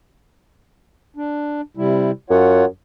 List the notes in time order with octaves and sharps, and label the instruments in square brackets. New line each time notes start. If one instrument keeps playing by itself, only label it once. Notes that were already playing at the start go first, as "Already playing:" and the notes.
[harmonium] D4
C3 G3 E4
[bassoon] F#2 [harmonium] F4 C#5 F#5